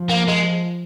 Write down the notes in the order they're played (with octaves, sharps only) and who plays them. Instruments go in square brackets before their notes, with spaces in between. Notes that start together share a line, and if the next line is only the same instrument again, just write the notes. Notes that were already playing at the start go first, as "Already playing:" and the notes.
Already playing: [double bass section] F3
[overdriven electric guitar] A#3
G#3